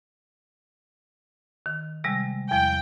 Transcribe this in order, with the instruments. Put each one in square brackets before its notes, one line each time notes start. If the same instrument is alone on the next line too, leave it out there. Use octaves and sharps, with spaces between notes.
[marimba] D#3
C3 G3 G#3
[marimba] E2 F3 [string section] G5